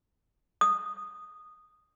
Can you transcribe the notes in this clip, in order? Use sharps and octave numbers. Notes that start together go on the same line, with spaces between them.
D#6